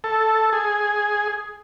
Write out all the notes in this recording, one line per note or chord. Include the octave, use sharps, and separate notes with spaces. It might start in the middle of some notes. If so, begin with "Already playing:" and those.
A4
G#4